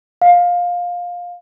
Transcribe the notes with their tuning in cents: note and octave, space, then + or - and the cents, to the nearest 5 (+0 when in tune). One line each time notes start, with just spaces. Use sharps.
F5 +15